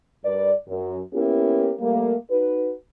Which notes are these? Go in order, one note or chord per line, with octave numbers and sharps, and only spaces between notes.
G2 A#4 B4 D5
F#2
A#3 B3 C#4 E4 G4
G3 A3 A#3
D#4 F#4 B4